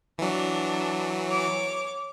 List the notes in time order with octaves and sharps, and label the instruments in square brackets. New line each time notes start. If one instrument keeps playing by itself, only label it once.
[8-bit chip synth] E3 F#3 [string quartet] D4
[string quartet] C#5 D6